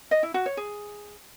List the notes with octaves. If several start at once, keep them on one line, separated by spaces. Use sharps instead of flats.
D#5
E4
F#4
C#5
G#4